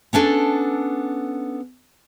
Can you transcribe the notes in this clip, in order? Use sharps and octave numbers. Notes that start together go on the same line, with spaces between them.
B3 C#4 D4 A4